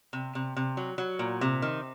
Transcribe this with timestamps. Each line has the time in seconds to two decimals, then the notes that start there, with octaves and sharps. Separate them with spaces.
0.13 C3
0.35 C3
0.57 C3
0.77 F#3
0.98 F#3
1.19 A#2
1.41 C3
1.62 D#3